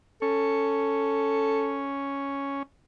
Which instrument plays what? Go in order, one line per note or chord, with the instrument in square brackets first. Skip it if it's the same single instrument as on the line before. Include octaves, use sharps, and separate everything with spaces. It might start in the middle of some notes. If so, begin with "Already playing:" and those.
[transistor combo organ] C#4 [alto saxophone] A4